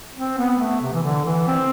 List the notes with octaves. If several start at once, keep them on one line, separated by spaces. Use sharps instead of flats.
C4
B3
A3
C3
E3
D3
E3
C4